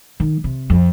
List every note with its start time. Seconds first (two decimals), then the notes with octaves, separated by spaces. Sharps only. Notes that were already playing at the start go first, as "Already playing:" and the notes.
0.20 D#3
0.44 C3
0.70 F2